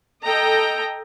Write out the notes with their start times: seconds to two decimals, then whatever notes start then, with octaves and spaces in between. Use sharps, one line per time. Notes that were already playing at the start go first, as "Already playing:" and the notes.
0.24 A4 D#5 G5 A#5